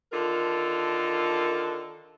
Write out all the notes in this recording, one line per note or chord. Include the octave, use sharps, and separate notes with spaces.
D3 D#3 F4 A4 A#4